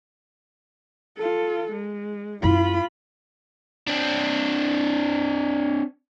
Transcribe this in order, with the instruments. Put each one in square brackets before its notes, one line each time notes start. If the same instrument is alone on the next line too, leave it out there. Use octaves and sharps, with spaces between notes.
[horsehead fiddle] F4 A4
G#3
[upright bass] F#2 E4 [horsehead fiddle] F4 B5
[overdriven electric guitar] C4 D4